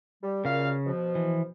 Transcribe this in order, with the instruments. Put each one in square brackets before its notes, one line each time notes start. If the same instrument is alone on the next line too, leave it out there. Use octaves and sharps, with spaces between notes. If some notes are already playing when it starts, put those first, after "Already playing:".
[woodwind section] G3
[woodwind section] F#2 A#2 F5 [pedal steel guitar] C#3
[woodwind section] B2 F3
[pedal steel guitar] E3